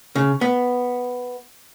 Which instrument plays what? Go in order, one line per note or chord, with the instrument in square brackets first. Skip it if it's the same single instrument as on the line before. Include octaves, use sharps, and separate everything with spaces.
[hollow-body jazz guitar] C#3
B3